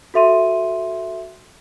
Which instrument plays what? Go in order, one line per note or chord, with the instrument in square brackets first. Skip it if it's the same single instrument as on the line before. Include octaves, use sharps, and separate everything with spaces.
[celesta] F#4 A4 E5 C6 D#7